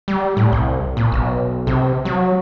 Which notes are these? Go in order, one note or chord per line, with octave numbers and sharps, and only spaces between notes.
G3
A2
C2
A#2
B1
C3
F#3